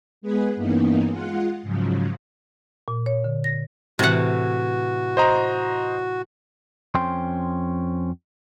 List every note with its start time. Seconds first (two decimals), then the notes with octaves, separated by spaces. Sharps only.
0.21 G#3 B3 G#4 B4
0.56 G2 E3 A#3 B3 C#4 D#4
1.07 G#3 F4 F#5
1.62 G#2 C#3 F3 F#3
2.88 A#2
3.06 C#5
3.24 D3
3.44 A#6
3.99 A2 C3 E3 F#4 F#5
5.17 C5 D#5 A#5
6.95 F2 C#4 C5 G5 C6